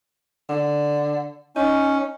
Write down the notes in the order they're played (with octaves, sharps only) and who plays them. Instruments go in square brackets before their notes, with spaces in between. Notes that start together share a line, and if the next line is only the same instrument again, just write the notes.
[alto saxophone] D3
[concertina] C#4 [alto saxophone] D#4